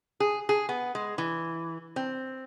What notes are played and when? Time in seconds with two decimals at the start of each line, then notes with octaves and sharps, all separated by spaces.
0.20 G#4
0.49 G#4
0.69 B3
0.95 G#3
1.18 E3
1.96 C4